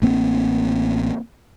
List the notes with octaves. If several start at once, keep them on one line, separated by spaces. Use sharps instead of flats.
A1 A#3 C4